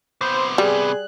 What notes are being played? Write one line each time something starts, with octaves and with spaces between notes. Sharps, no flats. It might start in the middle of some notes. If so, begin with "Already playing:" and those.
C3 B3 C5
G3 G#4 F#6